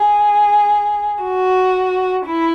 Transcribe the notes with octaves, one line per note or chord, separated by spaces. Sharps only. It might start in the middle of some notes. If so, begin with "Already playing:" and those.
Already playing: G#4
F#4
E4